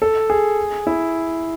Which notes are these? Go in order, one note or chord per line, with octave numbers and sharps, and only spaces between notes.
A4
G#4
E4